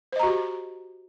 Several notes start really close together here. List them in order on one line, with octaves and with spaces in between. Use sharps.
C5 D#5 A#5 F#4 G4